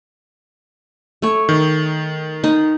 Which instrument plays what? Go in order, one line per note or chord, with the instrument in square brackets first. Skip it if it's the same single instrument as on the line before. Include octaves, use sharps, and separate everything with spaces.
[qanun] A3 C#5
[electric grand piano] D#3
[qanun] D#4